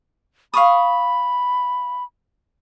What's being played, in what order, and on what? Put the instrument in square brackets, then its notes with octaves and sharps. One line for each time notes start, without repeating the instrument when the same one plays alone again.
[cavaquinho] F5 C#6 D#6 [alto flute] B5